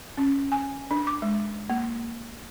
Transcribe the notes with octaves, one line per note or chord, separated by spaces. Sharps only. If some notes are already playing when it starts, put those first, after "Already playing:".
C#4
G#5
D4
D6
G#3
A#3